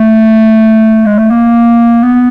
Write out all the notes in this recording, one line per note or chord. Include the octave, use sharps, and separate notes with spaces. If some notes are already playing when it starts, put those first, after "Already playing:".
Already playing: A3
G#3
A3
A#3
B3